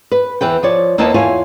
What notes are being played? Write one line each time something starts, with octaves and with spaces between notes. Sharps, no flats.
B4
E2 E3 B4 G5
F3 C#5 D5
D#2 A#3 B3 E4 D#5 A5
E2 E4 F4 C#5 G#5